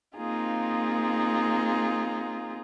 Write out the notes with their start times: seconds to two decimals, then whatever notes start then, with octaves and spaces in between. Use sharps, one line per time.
0.16 A#3 C4 D#4 F4 G#4